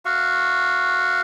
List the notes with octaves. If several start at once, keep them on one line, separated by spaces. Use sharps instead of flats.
F#4 F5 C#6